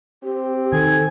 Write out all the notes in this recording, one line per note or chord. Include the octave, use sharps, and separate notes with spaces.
C4 G4
D#3 A4 G#5